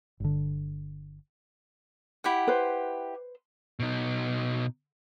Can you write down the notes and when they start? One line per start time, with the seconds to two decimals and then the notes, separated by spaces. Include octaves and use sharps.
0.20 G1 D3
2.24 E4 G4 F#5
2.47 B4 C5
3.79 B2 D#4